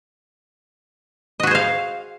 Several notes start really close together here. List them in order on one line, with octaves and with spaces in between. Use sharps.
D#5 F#4 G#4 C5 F5